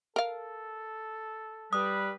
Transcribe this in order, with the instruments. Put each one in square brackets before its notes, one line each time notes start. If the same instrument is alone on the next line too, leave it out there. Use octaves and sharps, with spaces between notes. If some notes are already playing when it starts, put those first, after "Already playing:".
[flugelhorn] A4 [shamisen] A#4 F5
[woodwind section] G3 B4 [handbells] D#6